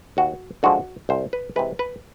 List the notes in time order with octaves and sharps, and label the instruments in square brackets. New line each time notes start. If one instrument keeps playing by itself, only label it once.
[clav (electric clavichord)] D#2 F#4
D3 F3 G#3 F#4
C2 C5
B4
C3 E3 G#3 B4
B4